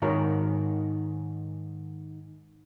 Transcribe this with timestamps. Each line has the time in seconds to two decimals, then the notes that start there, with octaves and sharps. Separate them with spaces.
0.02 G#2 D#3 F#4 A#4 C#5 A#5